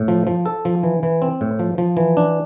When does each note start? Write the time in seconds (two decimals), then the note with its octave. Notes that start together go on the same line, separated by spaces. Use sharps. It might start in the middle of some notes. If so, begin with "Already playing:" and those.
Already playing: A2
0.08 F3
0.27 F3
0.46 A4
0.65 F3
0.83 E3
1.03 E3
1.22 C4
1.41 A2
1.59 F3
1.78 F3
1.97 E3
2.17 D4